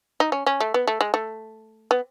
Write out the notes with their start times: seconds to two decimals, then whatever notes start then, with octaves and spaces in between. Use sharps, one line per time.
0.20 D#4
0.32 C#4
0.46 C#4
0.60 A3
0.74 B3
0.87 A3
1.01 G#3
1.14 A3
1.91 B3